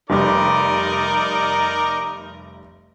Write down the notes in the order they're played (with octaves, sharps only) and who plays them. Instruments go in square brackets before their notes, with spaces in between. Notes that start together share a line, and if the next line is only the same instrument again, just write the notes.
[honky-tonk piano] F1 G3 D6 [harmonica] D#4 A#4 D5